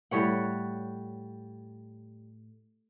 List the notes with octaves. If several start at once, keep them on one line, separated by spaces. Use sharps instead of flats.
A2 G3 C#5 F#5